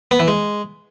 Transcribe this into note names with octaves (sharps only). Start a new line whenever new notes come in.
B3
E3
G#3